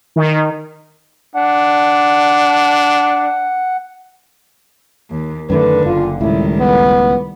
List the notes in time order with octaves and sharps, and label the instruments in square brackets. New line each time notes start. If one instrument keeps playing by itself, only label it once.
[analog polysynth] D#3
[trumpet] D4 [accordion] F#5
[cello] D#2
[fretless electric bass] F#2 D#3 A3 [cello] D3 [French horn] B4
[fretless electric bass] F#1 [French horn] F4
[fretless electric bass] C#2 A2 [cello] D#3 G3 [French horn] E4
[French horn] B3